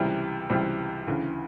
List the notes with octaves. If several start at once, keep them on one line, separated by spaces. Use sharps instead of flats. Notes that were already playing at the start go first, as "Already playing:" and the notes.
Already playing: C#2 C3 E3 G3
C#2 C3 E3 G3
D2 C#3 E3